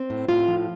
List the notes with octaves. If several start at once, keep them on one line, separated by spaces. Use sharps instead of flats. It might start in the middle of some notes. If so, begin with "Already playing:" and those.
Already playing: C4
A2
A2 F4 F5
F3